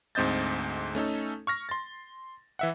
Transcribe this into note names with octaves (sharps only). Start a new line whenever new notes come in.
D2 G#2 C4 D#5 G6 A6
A3 C#4 D#4 A4
C#6 F6 A#6
C6 A6
E3 E5 F#5